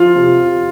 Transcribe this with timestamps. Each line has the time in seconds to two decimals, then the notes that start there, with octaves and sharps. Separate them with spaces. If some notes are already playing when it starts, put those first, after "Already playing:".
Already playing: F3 F4
0.15 C3